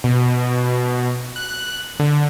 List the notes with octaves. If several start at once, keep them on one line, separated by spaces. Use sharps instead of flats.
B2
F#6
D3